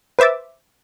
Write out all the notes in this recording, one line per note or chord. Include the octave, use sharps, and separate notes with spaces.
B4 C5 E5 D6 A6